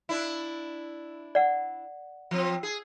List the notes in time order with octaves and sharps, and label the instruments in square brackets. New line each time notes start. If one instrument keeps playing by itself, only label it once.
[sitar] D4 E4
[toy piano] D5 F#5
[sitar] F3 C4
G#4